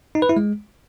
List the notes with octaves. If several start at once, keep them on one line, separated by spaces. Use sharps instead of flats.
D#4
B4
E4
G#3